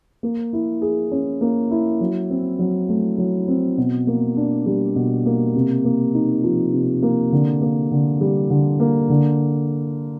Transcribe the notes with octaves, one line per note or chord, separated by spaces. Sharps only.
A#3
E4
G#4
C#4
A#3
E4
F#3
C4
F#3
A3
F#3
C4
B2
A#3
D4
G3
B2
A#3
C3
A#3
D#4
F3
C3
A#3
D3
A#3
D3
G3
D3
A#3
D3